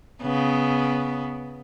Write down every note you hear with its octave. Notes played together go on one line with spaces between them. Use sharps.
C#3 B3